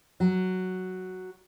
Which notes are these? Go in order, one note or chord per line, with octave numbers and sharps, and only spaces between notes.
F#3